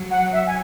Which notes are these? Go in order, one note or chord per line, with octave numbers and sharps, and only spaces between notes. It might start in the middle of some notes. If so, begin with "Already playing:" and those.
Already playing: F#3
F#5
E5
G#5